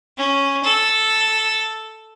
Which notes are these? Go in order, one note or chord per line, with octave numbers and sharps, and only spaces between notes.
C#4
A4